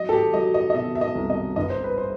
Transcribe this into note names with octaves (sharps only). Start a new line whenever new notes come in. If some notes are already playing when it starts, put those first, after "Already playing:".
Already playing: F#3 D#5
A4
G4
F#3 D#5
D#5
D#5
B2 E5
E5
D#5
C2
D#5
G1 D#5
C5
B4
C5